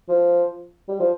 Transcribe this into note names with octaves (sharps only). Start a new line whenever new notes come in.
F3
G3
F3